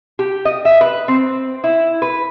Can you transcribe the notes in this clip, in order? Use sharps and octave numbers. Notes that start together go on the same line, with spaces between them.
G4
D#5
E5
B4
C4
E4
B4